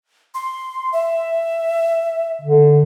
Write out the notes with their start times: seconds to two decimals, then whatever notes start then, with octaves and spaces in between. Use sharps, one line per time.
0.34 C6
0.93 E5
2.41 D3